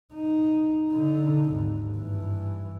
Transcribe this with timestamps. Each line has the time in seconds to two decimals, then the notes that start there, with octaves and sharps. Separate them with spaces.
0.13 D#4
0.91 D3 D#4
1.51 G#1 D#2
1.95 G2 E3